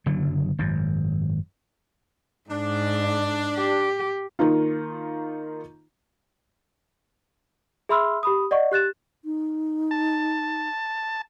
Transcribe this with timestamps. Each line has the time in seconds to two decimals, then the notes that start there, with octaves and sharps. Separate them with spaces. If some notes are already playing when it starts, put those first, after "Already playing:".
0.06 F#1 D3 F#3
0.59 G#1 F#2
2.50 G#2 D4
3.57 G4
4.39 D#3 A#3 D#4 F4
7.89 G#4 E5 B5 C6 E6 F6
8.23 G4 B5 D#6
8.51 D5 D#5 F#5 C#6
8.71 G4 F#6 A6 E7
9.25 D#4
9.91 A5